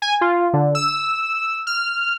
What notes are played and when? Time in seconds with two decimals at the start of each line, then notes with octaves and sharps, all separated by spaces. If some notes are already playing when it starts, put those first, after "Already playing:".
0.02 G#5
0.21 F4
0.53 D3
0.75 E6
1.67 F6